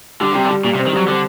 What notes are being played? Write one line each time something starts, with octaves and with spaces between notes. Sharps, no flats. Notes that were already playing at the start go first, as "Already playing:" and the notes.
D3 G3
C3 G3
D3
G3
A#2 G3
C3
C4
D#3
F#3 G3
D3 C4